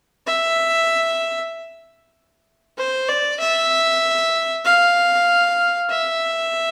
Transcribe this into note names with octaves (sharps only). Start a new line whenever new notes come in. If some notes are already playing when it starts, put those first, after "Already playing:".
E5
C5
D5
E5
F5
E5